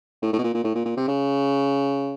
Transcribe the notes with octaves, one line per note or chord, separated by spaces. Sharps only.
A2
A2
B2
A#2
A#2
A2
A#2
A#2
C3
C#3